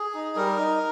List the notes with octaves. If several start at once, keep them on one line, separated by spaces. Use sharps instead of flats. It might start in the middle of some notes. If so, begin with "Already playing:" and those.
Already playing: G#4
D#4
G3 A#4
D#4